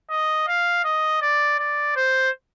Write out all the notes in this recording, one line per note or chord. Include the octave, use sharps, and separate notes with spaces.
D#5
F5
D#5
D5
D5
C5